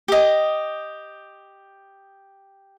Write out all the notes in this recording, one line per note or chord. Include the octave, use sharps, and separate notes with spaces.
G4 D#5